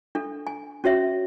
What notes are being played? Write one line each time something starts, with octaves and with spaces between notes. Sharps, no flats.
D4 A4
G#5
C#4 F#4 C#5 E5